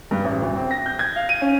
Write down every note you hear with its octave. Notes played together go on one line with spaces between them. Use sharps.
G2
A1
D2
C4
A#6
G6
G#6
F5
D#7
C#4